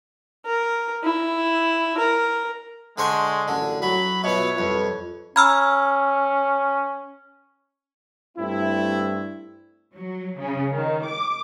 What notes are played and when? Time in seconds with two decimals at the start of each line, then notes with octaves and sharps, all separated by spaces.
0.46 A#4
1.03 E4
1.98 A#4
2.98 D3 G#3 C5 C#6
3.48 A1 F#2 A2 D3
3.82 F#3 B5
4.24 B2 B3 F4 B4 C#5 E5
4.58 C2 F2 B4
5.36 C#4 A#5 B5 E6 F6 G#6
8.37 G2 A3 C4 E4
9.95 F#3
10.38 C#3
10.73 D#3
11.06 D6